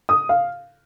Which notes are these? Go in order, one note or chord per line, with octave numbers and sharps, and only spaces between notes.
D#6
F5